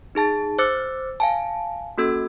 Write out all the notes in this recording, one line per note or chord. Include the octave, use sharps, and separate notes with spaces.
D#4 G#4 A5 A6
C5 D6 E6 F#6 A6 C#7
F5 G#5 A5
A#3 C#4 F#4 A4 E6 G#6